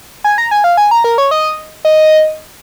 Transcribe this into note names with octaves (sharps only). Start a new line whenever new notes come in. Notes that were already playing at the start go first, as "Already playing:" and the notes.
G#5
A#5
G#5
F5
G#5
A#5
A#4
C#5
D#5
D#5